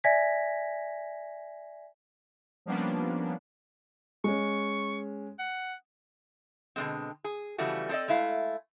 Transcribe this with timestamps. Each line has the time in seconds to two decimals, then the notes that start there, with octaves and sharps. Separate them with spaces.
0.04 D5 E5 G#5 G#6 A#6 B6
2.66 F3 G3 A#3 B3 C#4 D4
4.24 G#3 C#4 C#6
5.39 F#5
6.76 B2 D3 F3 G#3 C4
7.24 G#4
7.58 F2 C#3 E3 G3 A3 F#4
7.89 C4 A4 D5 D#5
8.08 G#3 A3 E4 F5